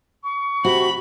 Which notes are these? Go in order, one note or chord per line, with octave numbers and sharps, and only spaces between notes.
C#6
C3 F#4 B5